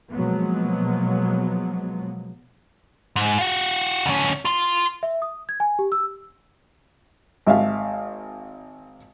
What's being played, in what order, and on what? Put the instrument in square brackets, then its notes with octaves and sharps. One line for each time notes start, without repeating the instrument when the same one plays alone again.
[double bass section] B2 F3 F#3 G#3 A#3 B3
[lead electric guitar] G#2
F4 F#4
D2 C#4
F4 C6
[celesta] E5
D#6
G#6
G#5
G4
E6
[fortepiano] G#1 E5 F5